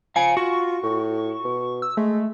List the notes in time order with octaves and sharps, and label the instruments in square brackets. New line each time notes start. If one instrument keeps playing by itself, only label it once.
[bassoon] F3 [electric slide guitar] F5 G#5 [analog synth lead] C#7
[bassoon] F4 [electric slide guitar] F#4 [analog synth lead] C#6
[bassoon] A2
B2
[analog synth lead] E6
[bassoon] G#3 [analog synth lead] A3